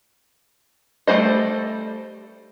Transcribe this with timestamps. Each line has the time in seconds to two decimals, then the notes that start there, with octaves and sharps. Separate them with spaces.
1.07 G3 A3 G#4 C5 D#5